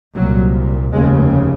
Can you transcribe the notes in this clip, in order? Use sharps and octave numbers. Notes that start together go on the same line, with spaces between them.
C2 A#2 F#3
F1 D#2 C#3 G#3